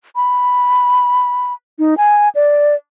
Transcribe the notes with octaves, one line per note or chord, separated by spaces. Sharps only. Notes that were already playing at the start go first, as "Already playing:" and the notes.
B5
D#4
G#5
D5